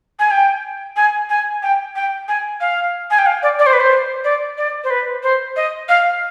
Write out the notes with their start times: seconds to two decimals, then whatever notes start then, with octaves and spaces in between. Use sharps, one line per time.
0.19 G#5
0.31 G5
0.96 G#5
1.30 G#5
1.63 G5
1.96 G5
2.28 G#5
2.61 F5
3.11 G#5
3.19 G5
3.26 F5
3.43 D5
3.59 D5
3.66 C5
3.73 B4
3.80 C5
4.24 D5
4.58 D5
4.84 C5
4.90 B4
5.23 C5
5.56 D#5
5.89 F5